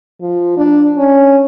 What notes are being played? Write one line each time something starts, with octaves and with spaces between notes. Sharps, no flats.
F3
D4
C#4